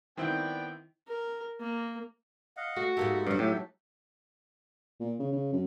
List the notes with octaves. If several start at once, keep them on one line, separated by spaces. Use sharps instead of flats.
D#3 B3 C4 E4 D5 G5
A#4
A#3
D#5 F5 F#5
A3 F#4
G#2 A#3 D#4 G4 A4 E5
G2 F#3 F#4
A2 G4
A#2
C#3
C#3
F#2